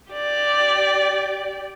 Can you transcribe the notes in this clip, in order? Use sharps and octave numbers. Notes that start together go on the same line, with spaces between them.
G4 D5